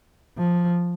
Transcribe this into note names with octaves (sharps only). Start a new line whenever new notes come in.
F3